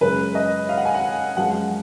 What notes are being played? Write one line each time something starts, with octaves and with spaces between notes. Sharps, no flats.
F#2 C#3 G#3 B4
D#5
F5
F#5
G#5
F#5
F#2 F3 G#3 F#5